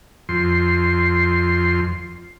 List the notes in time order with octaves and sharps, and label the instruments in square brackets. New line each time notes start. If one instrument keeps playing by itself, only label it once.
[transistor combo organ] F2 C6